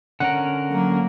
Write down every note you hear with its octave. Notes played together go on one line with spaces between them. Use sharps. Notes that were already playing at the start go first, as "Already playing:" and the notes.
D3 C#4 A#4 F#5
F#3 A#3